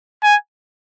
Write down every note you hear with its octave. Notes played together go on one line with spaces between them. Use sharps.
G#5